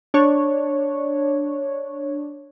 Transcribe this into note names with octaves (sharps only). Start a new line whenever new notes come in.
D4 C#5